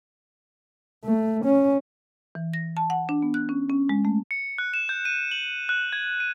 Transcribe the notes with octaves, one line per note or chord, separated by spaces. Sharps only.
A3
C#4
E3
A#6
A5
F#5
D4
B3
F#6
C#4
C#4
G#3
A3
C#7
F#6
E7
G6
D#7
F#7
F#6
G#6
D#7